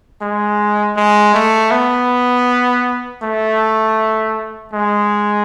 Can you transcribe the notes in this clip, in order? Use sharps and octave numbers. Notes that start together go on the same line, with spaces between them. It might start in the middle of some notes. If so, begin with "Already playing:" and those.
G#3
G#3
A3
B3
A3
G#3